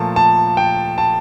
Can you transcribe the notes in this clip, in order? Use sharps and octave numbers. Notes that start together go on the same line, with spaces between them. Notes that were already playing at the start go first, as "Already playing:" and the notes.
Already playing: A#2 F3 A3 A5
A5
G5
A5